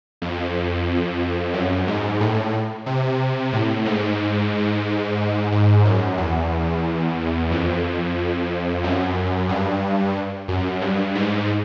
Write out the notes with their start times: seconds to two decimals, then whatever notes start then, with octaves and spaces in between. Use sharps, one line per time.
0.22 F2
1.54 F#2
1.87 G#2
2.20 A2
2.86 C3
3.53 A2
3.86 G#2
5.52 G#2
5.85 F#2
6.18 E2
7.51 F2
8.84 F#2
9.49 G2
10.48 F#2
10.81 G2
11.15 G#2